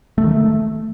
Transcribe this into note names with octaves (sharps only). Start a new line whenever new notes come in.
A3
D#3
A3